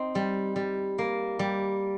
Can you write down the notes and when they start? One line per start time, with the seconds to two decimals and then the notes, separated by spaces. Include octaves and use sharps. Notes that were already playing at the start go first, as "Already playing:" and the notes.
Already playing: C4 D#4
0.15 G3
0.56 G3
0.99 A#3
1.39 G3